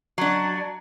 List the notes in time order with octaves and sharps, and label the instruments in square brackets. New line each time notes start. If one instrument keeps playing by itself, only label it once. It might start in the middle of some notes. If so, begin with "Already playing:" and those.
[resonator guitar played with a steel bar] F#3 D4